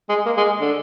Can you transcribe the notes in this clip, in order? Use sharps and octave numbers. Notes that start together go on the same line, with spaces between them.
G#3
A#3
G#3
D3